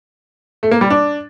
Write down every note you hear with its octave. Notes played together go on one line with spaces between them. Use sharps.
A3
A#3
G3
D4